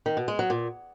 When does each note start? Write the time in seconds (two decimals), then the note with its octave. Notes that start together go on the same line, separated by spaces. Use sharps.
0.06 D#3
0.17 B2
0.28 G#3
0.39 F#3
0.50 A#2